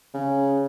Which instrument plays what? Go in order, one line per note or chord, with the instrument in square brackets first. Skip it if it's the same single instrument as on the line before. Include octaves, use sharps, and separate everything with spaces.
[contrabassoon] C#3